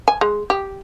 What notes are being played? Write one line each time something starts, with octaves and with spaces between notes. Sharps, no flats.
G#5
G#3
G4